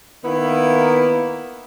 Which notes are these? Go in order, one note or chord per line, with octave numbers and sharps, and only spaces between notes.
D#3 A#3 B3 E4